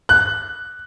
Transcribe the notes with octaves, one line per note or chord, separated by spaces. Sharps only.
F#6